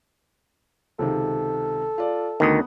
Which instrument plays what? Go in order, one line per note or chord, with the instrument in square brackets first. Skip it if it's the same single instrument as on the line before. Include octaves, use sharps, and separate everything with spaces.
[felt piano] C#2 C3 D#3 [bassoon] A4
[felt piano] F4 D5
[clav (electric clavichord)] D2 D#3 [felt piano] B3 D#6